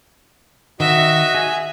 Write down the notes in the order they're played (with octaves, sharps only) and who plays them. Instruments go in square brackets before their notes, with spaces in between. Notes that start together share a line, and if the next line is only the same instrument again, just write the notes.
[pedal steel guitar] D#3 [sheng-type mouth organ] F#4 D#5 [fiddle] E5
[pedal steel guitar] G#4